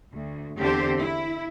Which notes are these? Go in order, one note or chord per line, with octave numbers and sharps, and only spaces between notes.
D2
E2 D3 C4 D4 G4 C5
E4